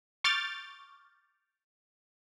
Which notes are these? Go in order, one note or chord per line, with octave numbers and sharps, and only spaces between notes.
C#6 D6 F6 G6 A6